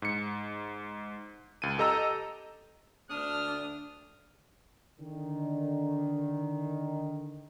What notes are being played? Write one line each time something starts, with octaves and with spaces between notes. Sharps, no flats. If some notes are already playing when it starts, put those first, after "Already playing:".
G#2 C#7
C#2 D#7
G4 A4 D#5 A#5 E6
D2 D4 D#6 F6
D3 D#3